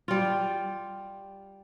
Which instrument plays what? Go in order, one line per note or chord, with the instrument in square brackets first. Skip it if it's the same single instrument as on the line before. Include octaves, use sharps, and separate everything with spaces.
[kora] G3 F4